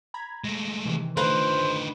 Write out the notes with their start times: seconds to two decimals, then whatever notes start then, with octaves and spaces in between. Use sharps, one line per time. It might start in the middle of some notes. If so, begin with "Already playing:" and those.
0.14 A#5 B5 G#6
0.44 G#3 A3 A#6
0.86 C3 D#3 E3
1.17 D3 D#3 A3 D#4 F4 B4 C5 F5